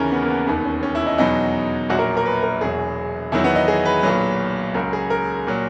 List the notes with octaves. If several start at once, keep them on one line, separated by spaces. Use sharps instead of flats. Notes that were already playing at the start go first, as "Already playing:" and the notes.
Already playing: D#2 C#3 E3 C#4 A#4
B3
A#3
B3
E1 D#2 D#3 B3
C#4
C#4
E4
D#4
E2 B2 F#3 D#4
A#1 A#2 F#3 F#4
A#4
A#4
B4
A#4
E1 E2 B2 F#3 G#4
E2 D#3 F#3 E4
B3
D#4
G#4
B4
B1 A#2 F#3
C#2 C#3 F#3 A#4
G#4
A#4
A#2 F#3